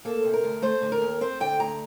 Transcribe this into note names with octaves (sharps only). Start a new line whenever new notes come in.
A#3 A4
C3
A#4
D2
A3 C5
D3
A#4
D#2
C4 C5
D3 G5
D2 A#5